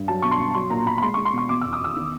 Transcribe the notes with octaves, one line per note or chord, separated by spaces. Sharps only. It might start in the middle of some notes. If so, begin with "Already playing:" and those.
Already playing: G2
F#3 A5
B2 C#6
C6
B2
F#3 C6
A#2 A#5
A#2 B5
B5
G#3 C6
G#3 C#6
C6
B2 C#6
B2 D6
E2 E6
D#6
E2 E6
D#3